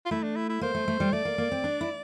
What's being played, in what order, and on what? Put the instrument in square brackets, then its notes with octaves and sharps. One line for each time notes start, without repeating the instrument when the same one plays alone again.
[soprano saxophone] F4
[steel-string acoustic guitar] A3 [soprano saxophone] E4
[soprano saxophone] D4
E4
E4
[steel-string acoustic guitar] A#3 [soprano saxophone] C5
[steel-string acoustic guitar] A3
A3
G3
[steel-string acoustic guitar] A3 [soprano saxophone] D5
[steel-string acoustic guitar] A#3
A#3
C4
D4
E4